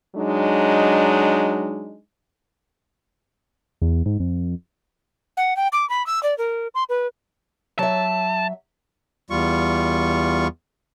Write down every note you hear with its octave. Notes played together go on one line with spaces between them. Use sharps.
F#3 G#3 D4 D#4
E2
G#2
F2
F#5
G5
D6
B5
E6
D5
A#4
C6
B4
F#3 E5 A5
E2 G3 F4 C#6